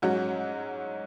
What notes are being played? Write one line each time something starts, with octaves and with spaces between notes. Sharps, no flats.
G#2 F#3 C#4 F#4